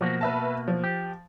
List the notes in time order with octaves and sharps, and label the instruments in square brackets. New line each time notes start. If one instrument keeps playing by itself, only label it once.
[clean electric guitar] B2 A#3 F#4 [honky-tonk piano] F3
[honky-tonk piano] B4 E5 A5
F3
[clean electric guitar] G4